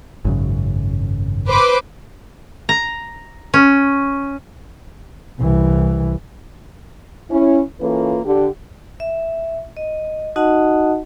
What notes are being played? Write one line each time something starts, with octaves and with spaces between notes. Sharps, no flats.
G#1 F#2 C#3
B4 C5 D6
A#5
C#4
C2 E3
C#4 E4
E3 A#3 C#4 F4 A4 B4
D3 G4
E5
D#5
D#4 F#4 D#5 F#5 A5